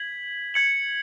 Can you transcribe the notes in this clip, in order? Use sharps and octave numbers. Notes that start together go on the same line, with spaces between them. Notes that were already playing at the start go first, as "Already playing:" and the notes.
Already playing: G#6 B6 F#7
G#6 C#7 F#7